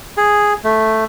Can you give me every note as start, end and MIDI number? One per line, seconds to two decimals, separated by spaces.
0.17 0.53 68
0.64 1.04 57